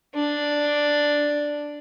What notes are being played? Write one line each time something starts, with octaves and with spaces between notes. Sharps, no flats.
D4